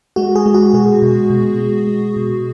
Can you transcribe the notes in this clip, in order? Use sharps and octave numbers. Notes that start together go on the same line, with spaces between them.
G#3 F#4
G#4
G#3
F#4
B2 G#4
B2
B2
G#3
G#3
B2